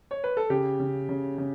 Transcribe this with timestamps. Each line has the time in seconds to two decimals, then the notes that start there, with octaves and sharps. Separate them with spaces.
0.11 C#5
0.24 B4
0.37 A4
0.50 C#3 G4
0.80 C#3
1.09 C#3
1.38 C#3